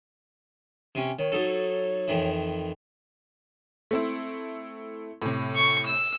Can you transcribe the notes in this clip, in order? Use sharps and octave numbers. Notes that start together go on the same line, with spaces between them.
C3 C#4
D#3 C#5
F#3 D#4 A4
F2 D#3 E3
A3 C4 E4
A2 C3
C#6
E6